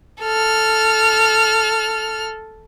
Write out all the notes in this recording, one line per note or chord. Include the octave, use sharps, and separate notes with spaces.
A4 F6